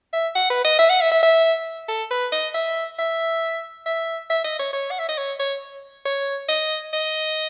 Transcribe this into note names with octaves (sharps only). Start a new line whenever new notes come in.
E5
F#5
B4
D#5
E5
F#5
E5
E5
E5
A4
B4
D#5
E5
E5
E5
E5
D#5
C#5
C#5
F#5
E5
D#5
C#5
C#5
C#5
D#5
D#5